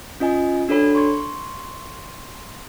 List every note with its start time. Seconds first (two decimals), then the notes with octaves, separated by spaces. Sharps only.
0.20 C#4 F4 D#5 G#5
0.69 D4 F#4 A4 C#5 B5
0.95 C6 C#6 G#6